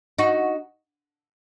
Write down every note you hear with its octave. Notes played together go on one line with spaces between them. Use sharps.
D#4 F#4